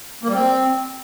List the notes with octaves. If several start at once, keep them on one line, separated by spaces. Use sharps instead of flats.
A#3
G3
C4